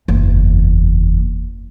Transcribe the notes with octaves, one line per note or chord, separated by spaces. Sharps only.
F#1 E2